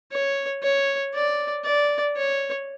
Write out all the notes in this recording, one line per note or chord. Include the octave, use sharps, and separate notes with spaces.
C#5
C#5
D5
D5
C#5